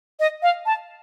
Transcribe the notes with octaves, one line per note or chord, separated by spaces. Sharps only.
D#5
F5
A5